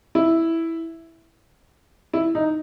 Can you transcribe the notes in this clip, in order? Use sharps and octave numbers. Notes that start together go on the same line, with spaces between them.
E4
E4
D#4